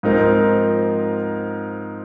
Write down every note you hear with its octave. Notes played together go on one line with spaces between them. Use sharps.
G#2 F3 C4 D#4 A#4